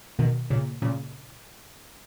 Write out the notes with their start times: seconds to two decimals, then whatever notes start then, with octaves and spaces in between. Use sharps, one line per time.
0.19 B2 D#3
0.50 A#2 C#3
0.82 A#2 C#3